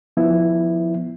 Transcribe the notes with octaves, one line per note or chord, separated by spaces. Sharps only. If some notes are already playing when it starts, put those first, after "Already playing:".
F3 B3 E4